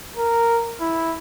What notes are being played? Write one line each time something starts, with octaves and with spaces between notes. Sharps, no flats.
A#4
E4